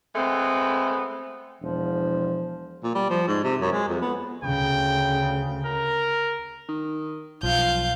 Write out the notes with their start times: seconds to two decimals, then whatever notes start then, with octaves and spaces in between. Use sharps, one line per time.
0.16 G#3 A3 B3 C4
1.61 E1 F3
2.84 A#2
2.95 G3
3.10 F3
3.28 G#2
3.44 C3
3.61 F#2
3.72 G#3
3.89 F2
4.01 B3
4.44 D2 C#3 G5
5.66 A#4
6.69 D#3
7.43 B1 F3 F5 G6